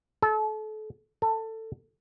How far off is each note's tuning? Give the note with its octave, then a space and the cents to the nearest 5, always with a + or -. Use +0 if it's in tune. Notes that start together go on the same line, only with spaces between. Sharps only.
A4 -35
A4 +15